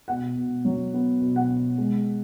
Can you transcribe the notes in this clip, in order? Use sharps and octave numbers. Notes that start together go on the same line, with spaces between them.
B2 F#5
B2
F#3
B3
B2
F#5
B2
G#3